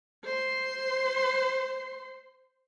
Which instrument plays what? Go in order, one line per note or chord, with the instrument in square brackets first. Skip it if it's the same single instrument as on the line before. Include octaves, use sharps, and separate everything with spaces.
[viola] C5 C6